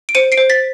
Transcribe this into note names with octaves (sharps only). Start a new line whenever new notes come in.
D7
C5 C#7 D#7
C7 D7
C5
A6 B6